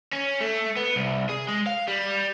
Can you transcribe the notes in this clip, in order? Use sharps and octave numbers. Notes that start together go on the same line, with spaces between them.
C#4
A3
B3
C2
G#4
G#3
F5
G3